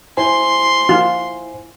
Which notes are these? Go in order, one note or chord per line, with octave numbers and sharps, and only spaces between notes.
E4 C5 G#5 C6
F4